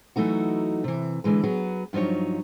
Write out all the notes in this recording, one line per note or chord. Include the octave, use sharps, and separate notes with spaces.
E3 F#3 A3 D#4 F#4
C3 E3
D3 E3 G#3 B4
F#3 B3 G#4
G2 F3 F#3 D#4 C#5